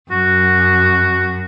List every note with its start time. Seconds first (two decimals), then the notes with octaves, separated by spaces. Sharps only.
0.11 F#2 F#4